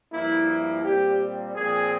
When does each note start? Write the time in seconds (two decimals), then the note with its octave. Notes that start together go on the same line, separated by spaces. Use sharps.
0.12 G2 F3 A#3 E4
0.47 E4
0.83 A#2 G3 C4 G4
1.55 A#2 F3 C4 G#4